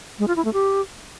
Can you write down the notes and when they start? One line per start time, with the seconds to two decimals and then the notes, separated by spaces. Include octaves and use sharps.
0.19 G#3
0.28 F4
0.36 E4
0.45 A3
0.53 G4